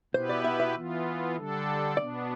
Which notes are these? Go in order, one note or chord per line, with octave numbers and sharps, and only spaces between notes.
B2 B3 E4 G4 B4 C5
D5
E5
E5
E3 B3 F4
D3 G3 D4 A4
B2 B3 D4 D5